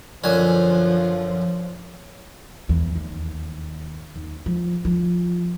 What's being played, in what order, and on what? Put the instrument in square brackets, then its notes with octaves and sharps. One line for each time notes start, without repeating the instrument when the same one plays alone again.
[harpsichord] F#2 D3 G#5 [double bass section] F3
[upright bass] E2
D#2
D#2
F3
F3